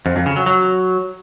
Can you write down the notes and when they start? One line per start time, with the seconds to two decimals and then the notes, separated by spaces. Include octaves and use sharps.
0.06 F2
0.16 F2
0.26 C#3
0.36 F#3
0.46 F#3